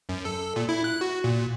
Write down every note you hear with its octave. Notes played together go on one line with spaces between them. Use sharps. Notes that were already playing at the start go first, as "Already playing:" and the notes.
F#2
A4
A#2
E4
F#6
F#4
A#2